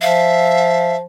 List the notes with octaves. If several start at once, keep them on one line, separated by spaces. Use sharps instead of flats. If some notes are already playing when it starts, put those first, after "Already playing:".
F3 E5 F5